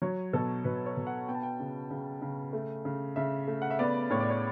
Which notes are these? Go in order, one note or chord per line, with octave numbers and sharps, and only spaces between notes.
F#3 C#5
B2 A4
B2 B4
C#5
B2
F#5
B3 G5
A5
G5
C#3
C#3
C#3
A3
C#3
C#3 E5
A3
F#5
E5
B3 D5
A2 C#5
D5
C#5